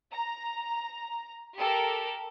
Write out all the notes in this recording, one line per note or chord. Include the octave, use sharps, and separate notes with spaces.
A#5
G4 A4 A#4